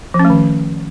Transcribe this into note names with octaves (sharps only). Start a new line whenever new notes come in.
F3
C#4
A3
D#3